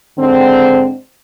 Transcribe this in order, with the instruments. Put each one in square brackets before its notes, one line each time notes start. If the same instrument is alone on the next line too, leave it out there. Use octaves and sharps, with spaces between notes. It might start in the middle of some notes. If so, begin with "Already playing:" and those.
[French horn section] G#2 D3 C4